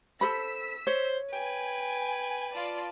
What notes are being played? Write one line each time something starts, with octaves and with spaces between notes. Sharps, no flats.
A4 C5 B5 E6 B6
C5 C#5
B4 G5 G#5
F4 D5 A5